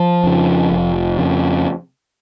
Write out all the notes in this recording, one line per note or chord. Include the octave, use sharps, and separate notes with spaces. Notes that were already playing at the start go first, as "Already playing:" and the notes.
Already playing: F3
F2 C#3
F1
F2 C#3